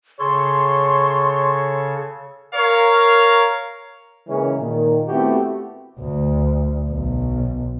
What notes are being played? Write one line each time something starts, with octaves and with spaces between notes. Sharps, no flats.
C#3 A4 C#5 C6 G#6
A#4 C#5 F5
C#3 E3 G#3 A#3 C#4
A#2 D#3
A3 B3 C4 E4 F#4 G4
D2
B1